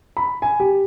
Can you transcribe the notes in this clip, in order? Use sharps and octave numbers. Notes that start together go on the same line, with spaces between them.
B5
G#5
G4